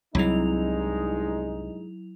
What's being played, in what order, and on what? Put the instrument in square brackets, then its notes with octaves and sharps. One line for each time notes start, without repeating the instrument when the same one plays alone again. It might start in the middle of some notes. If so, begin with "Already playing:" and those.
[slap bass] C2 C3 [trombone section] G2 G#3 D#4 [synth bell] F#3 E4 F7